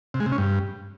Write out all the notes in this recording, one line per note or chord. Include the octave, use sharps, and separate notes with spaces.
C3
G#3
C3
C#4
G2